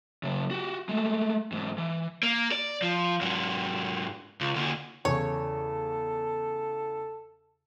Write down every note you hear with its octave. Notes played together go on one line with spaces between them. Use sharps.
C#3 F#3
F#4 G4
G#3 A3
E2 G#2
E3
A#3
D5
F3
G#2 F#3
C#2
D3 A#3
E2 C#3 A4 C#5